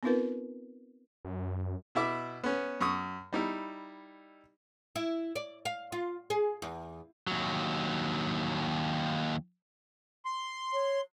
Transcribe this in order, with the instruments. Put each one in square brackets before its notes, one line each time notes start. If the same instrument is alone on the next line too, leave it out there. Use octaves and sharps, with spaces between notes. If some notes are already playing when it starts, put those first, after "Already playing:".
[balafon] B3 C4 D#4 F4 A#4 B4
[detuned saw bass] F#2
[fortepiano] B2 E4 E5 D6
B3 C#4
F#2 C#6 D#6
G3 D#4 E4
[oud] E4
D5
F5
F4
G#4
E2
[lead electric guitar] D#2 F#3
[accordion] C6
[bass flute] C#5